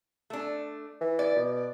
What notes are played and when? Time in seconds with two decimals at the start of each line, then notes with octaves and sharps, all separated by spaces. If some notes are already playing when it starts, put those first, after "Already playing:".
0.30 A3 D4
1.01 E3
1.19 D5
1.36 B2